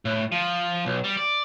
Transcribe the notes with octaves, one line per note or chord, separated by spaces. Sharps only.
A2
F3
B1
G3
D5